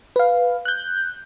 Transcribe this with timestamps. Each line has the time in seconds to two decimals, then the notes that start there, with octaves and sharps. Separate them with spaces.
0.16 B4 F5
0.65 F#6 G6